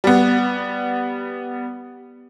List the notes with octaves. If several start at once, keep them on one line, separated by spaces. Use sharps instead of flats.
G3 B3